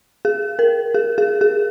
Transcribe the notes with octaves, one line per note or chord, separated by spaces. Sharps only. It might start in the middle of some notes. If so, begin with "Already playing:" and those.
G#4
A#4
G#4
G#4
G#4